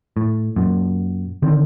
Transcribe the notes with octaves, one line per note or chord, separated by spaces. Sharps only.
A2
F#2 A#2
D3 D#3 C4